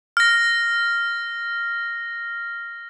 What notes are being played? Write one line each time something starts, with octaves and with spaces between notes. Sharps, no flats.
F6 A#6